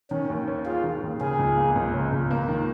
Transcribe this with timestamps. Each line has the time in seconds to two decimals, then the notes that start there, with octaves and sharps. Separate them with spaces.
0.11 D#3 C#4
0.30 D#2
0.48 C#4
0.66 F4 G#4
0.84 D#3
1.02 D#2
1.21 C#3 G#4
1.39 C#2
1.57 A#3
1.76 C#2
1.94 C#3
2.12 C#2
2.31 A#3
2.48 D#3